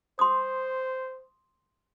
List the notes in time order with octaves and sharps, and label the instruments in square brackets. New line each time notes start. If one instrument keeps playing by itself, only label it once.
[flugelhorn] C5 [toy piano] C6 D#6